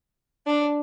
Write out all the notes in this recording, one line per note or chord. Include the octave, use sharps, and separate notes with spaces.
D4